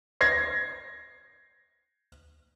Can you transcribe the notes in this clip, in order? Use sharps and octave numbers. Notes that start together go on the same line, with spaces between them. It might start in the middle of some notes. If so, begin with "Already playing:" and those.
G#6 A#6 C7